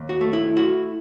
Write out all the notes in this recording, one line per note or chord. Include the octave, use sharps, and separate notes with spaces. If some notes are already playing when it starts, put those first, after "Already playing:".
Already playing: D#2
F#4
A3
E4
E4 F#4